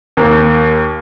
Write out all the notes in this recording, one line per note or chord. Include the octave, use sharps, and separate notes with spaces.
D#2 A#3